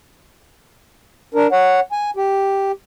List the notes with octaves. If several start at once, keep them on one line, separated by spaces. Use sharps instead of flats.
D4 A#4
C#5 F#5
G#5
G4